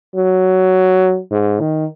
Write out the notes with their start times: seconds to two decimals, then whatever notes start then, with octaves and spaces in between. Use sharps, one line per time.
0.16 F#3
1.31 G#2
1.60 D#3